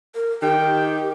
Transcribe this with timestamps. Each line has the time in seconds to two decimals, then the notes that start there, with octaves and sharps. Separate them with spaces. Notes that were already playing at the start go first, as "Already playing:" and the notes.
0.15 A#4
0.42 D#3 G4 G5